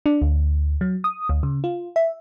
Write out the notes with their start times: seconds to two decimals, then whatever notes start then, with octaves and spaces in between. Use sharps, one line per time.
0.06 D4
0.22 D2
0.81 F#3
1.04 D#6
1.29 D2
1.43 C#3
1.64 F4
1.96 E5